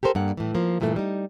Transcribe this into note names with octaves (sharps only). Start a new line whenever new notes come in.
G4 A4 A#4 C5
G2 A#3 F#5
A2 E3
F3 A#3
G2 A#2 E3 G3 A3
G3 D#4